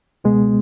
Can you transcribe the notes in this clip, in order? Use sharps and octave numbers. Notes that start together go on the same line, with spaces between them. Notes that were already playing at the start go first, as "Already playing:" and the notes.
C#2 B2 G#3 B3